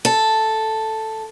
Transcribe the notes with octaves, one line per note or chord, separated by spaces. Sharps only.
A4